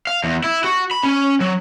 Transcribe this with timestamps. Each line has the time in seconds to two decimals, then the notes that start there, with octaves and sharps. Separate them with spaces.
0.07 F5
0.24 E2
0.44 E4
0.64 F#4
0.91 B5
1.03 C#4
1.41 F#3